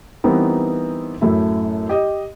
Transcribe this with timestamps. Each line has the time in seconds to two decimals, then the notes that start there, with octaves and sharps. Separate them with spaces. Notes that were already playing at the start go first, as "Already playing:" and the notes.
0.24 E3 G3 B3 C4 D#4 A#4
1.21 F#2 A2 A3 E4
1.89 G4 D#5